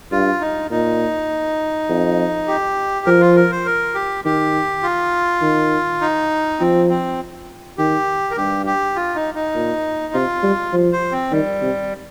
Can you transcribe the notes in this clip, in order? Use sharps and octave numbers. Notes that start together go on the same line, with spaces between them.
G2 F4
D#4
A#2 D#4
F2
G4
F3 A#4
F4
A#4
C5
A#4
G4
D#3 G4
F4
D#3
D#4
F3 C4
C4
D#3 G4
A#4
G2 G4
G4
F4
D#4
D#4
A#2
C3 F4
G3
F3
C5
C4
D#3 G3
C3